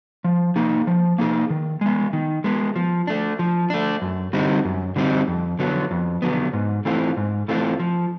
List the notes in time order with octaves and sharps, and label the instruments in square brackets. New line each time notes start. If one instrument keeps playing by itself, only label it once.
[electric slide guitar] F3
A#3 D#4 G#4
F3
A#3 D#4 G#4
D#3
G#3 B3
D#3
G#3 B3
F3
A3 D4
F3
A3 D4
F#2
D3 G3 C4 D#4
F#2
D3 G3 C4 D#4
F2
D3 F#3 B3
F2
D3 F#3 B3
G#2
E3 A3 C4 F4
G#2
E3 A3 C4 F4
F3